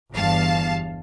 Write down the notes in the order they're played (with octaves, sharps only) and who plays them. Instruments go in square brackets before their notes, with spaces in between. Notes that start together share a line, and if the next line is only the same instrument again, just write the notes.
[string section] G1 E2 G2 F5 A5